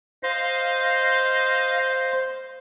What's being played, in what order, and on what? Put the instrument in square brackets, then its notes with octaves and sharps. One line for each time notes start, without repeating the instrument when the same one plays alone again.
[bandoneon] C5 [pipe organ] D#5 F5